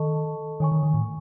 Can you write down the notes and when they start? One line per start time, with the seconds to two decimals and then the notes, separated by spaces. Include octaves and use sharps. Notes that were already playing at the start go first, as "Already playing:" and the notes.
Already playing: D#3 A4 D#5 A5 C#6
0.60 D#3 C#5 G#5 C#6
0.72 D#3
0.83 D#3
0.94 A2